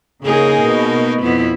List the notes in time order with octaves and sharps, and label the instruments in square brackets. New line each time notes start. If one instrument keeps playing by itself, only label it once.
[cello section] C#3 G#4 [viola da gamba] A#3 D#4 A#4
[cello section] B2
[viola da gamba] F2 B3 E4